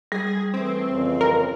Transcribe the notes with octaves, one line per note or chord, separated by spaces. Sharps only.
G3 G#4
E3 A3 C4
F2 C#3 E3
A#4